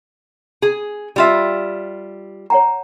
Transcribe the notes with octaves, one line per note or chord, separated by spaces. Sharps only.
G#4
G3 F4 E5
C#5 F#5 A#5